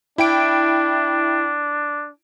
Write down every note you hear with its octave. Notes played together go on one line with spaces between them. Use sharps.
D4 E4 G5 D7